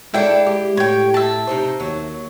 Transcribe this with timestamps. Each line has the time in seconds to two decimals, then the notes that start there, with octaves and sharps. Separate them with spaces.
0.14 G#3 A#3 D4 E4 A4 G5
0.46 G4
0.77 A2 C#5 G5
1.14 E5 A5
1.47 C3 D#4 C5
1.80 D#2 F#3